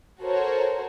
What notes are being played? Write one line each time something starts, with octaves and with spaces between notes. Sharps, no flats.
F#4 A4 A#4 C5 C#5